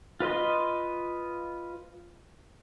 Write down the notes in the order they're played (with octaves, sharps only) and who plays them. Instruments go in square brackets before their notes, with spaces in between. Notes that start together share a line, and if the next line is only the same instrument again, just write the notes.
[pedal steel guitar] F4 B4 D#5 C6